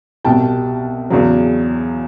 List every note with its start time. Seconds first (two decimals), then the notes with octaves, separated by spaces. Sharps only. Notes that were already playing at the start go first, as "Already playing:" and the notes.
0.24 C2 B2 G3 G5 A5
1.10 E2 C#3 F#3